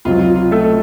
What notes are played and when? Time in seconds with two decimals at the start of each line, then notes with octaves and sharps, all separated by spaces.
0.05 C#2 C3 F#3 F4
0.20 F4
0.36 F4
0.51 A3 A4